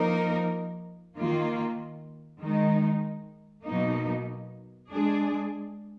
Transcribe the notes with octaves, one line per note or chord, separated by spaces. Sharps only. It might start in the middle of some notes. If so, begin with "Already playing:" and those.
Already playing: F3 A#3 D#4 A#4
D#3 A#3 F4
D#3 G#3 D#4
B2 F#3 A#3 D#4
G#3 D4 G#4